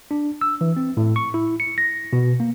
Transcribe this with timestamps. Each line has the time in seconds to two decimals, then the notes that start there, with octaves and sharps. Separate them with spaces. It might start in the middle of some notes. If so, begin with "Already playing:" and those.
0.11 D4
0.41 E6
0.61 E3
0.77 C4
0.97 A2
1.16 C#6
1.34 E4
1.60 C#7
1.78 A#6
2.13 B2
2.40 A#3